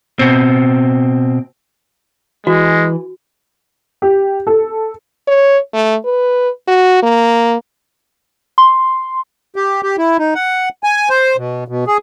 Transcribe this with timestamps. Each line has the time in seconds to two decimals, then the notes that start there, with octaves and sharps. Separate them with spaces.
0.19 B2 C4
2.47 E3 G#3 F#4
4.02 G4
4.47 A4
5.28 C#5
5.74 A3
6.05 B4
6.68 F#4
7.03 A#3
8.58 C6
9.56 G4
9.83 G4
9.98 E4
10.19 D#4
10.35 F#5
10.83 G#5
11.09 C5
11.37 B2
11.68 B2
11.87 G#4